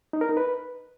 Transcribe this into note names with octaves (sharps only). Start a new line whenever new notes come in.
D#4
A#4
D#4
B4